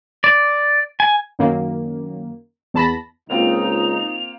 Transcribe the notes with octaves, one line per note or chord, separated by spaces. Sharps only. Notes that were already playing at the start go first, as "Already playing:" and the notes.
D5
G#5
F#2 D#3 A#3
E2 A5 B5 A#6
C#2 A#3 C4 D#4 F4 F7